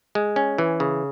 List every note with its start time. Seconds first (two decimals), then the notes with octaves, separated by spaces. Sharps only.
0.15 G#3
0.36 C#4
0.58 E3
0.80 C#3